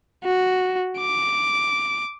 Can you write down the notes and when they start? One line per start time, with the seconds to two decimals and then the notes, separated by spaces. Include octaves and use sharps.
0.24 F#4
0.99 D6